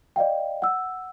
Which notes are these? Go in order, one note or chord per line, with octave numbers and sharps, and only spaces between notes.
D5 D#5 F5 G5
F#5 E6